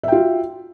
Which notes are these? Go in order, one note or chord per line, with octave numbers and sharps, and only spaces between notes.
F4 F#4 E5 G5